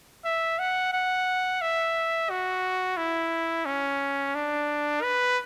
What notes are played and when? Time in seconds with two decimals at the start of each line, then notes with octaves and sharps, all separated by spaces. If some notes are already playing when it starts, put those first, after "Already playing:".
0.25 E5
0.59 F#5
0.93 F#5
1.61 E5
2.30 F#4
2.97 E4
3.65 C#4
4.35 D4
5.02 B4